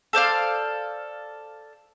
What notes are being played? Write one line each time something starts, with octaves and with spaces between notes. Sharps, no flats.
A4 C5 D5 F5